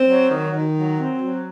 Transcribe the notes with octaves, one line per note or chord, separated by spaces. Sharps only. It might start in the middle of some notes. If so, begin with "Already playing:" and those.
Already playing: C4
F#3
D#3
D#3
F#3
C4
F#3